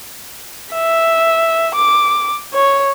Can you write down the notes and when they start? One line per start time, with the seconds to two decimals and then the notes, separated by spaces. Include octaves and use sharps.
0.74 E5
1.75 D6
2.54 C#5